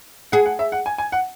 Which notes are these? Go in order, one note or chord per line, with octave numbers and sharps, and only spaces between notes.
G#4 F#5
F#5
E5
F#5
G#5
G#5
F#5